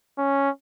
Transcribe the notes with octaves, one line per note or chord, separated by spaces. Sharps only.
C#4